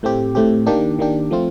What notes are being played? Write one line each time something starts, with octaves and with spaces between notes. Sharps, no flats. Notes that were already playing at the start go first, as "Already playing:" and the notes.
A2 A3 C4 G4
A2 A3 C4 G4
D#3 A#3 D4 G4
D#3 A#3 D4 G4
F3 A3 C4 F4